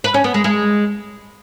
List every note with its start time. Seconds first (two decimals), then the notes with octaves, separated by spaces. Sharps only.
0.04 B4
0.14 C#4
0.24 B3
0.34 G#3
0.44 G#3